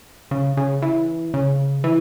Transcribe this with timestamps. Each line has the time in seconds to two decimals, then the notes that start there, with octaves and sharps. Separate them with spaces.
0.31 C#3
0.57 C#3
0.82 E3
1.34 C#3
1.84 E3